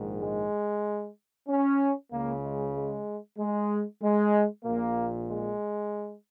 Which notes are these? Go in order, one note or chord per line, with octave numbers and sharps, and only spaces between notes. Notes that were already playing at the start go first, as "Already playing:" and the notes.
Already playing: A#1 G#2 D#3
G#3
C#4
C#2 C#3 A#3
G#3
G#3
G#3
G#3
A#1 A#2 A#3
G#3